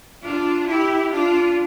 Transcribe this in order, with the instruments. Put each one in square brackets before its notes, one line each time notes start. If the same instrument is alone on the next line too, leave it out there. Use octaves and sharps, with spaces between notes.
[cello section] D4 F4
E4 G4
D4 F4